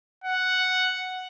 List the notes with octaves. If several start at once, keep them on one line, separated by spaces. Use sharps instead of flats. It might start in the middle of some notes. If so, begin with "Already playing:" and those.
F#5